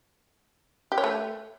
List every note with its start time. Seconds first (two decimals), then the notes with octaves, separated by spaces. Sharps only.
0.92 G4
0.98 C#5
1.04 A3